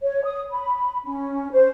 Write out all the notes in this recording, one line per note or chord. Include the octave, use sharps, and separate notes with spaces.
C#5
D#6
B5
C#4
C5